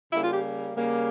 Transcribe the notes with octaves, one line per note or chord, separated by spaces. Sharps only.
C#3 G3 A#3 E4
F4
G4
C#3 G3 A#3